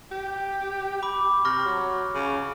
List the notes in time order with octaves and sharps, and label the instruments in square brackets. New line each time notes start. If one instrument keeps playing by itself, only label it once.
[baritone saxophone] G4
[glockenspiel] B5 D6
[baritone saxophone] C3 [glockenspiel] C#6 F6 A#6
[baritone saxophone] F#3
C#3